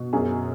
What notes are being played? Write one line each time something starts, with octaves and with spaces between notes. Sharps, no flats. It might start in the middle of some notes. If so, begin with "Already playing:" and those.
Already playing: B2
F#2 G#4